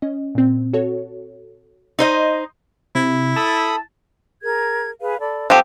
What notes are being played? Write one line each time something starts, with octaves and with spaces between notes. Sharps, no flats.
C#4 D#5
A#2 C4
F#4 A4 C#5
D#4 C5 D#5 C6
C3 E4
A4 A5 B5 D#6
G#4 A#4 G#6
G#4 B4 F5
A4 D5 B5
F3 C4 G4 A4 F#5